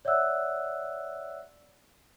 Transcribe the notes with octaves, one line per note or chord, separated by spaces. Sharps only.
C#5 D5 E5 F#5 E6 F#6